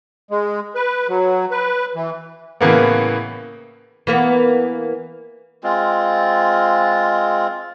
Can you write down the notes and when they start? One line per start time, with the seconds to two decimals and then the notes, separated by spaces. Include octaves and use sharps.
0.31 G#3
0.75 B4
1.09 F#3
1.51 B4
1.95 E3
2.61 A2 C#3 E3 A#3 B3
4.07 E3 A#3 B3
5.64 G#3 C4 F4